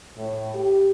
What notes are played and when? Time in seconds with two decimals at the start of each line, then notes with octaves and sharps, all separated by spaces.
0.18 A2
0.55 G4